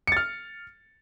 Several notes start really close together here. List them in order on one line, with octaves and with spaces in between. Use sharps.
C#7 A6 F6